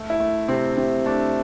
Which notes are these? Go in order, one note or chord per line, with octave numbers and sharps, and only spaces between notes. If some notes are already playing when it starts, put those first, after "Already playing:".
Already playing: A3
E4
A3
C3 C4
C3
A3 D4